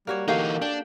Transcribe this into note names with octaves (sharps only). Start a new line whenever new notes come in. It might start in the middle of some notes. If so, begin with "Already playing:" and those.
G3 A#3 F#4 C#5
E3 A#3 D#4 F#4 G4 A4 F5
D4 G5